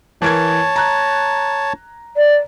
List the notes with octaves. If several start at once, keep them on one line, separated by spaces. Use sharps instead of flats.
E3 A#4 C#5 A5 G#6
A#5 F#6
D5